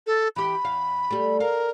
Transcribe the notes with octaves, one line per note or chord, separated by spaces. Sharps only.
A4
E3 G4 B5
E2 F5
G3 A3
A#4 F5